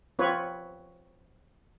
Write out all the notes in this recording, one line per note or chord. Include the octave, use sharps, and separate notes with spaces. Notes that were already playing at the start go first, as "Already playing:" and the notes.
C4 F4 B4 C#5